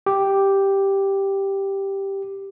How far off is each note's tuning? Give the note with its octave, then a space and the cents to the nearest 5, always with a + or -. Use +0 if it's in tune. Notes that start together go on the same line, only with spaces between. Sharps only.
G4 +0